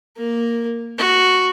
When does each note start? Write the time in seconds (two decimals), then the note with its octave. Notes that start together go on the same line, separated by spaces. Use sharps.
0.17 A#3 A#4
0.98 F#4